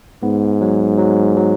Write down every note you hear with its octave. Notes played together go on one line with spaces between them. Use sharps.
G#2 B3
F#3
F#3
F#3